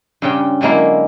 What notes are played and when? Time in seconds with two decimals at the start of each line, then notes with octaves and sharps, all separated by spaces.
0.22 G2 C#3 G5
0.61 D3 F#3 G#3 A#3 E4